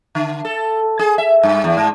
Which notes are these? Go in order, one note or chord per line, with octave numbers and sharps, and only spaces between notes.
D3
A4
G#4
E5
G2
E2
G#2